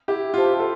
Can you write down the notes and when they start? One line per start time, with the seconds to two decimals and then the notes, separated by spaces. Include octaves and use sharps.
0.08 E4 G4
0.34 F4 G4 C5 E5 A5
0.60 F4 A4